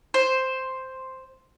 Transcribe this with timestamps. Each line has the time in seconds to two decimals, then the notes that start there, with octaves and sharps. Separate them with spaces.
0.14 C5